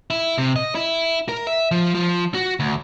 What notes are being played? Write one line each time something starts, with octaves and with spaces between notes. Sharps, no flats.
E4
C3
D#5
E4
A#4
E5
F3
F3
F#4
D2